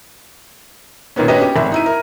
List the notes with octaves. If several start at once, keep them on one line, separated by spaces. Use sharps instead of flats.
A#2 D#3 A#3 B3 C#4
C#4 D4 G4 B4 D#5
G4
G#1 E5
D#4 E4 D#7
A#4